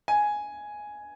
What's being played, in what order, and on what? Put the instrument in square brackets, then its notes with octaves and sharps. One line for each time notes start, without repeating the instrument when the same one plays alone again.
[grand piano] G#5